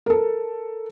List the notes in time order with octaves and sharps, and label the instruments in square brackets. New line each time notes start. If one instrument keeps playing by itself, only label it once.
[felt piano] A4 A#4